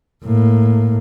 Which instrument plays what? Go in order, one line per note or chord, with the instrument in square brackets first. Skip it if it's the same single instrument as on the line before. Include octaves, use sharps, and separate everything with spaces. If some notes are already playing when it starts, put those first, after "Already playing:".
[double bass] A2 A#3